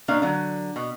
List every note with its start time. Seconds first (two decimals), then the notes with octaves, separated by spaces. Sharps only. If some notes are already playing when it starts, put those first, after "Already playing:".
0.08 B2 A#3 D4 F5
0.22 D3 F#3
0.76 B2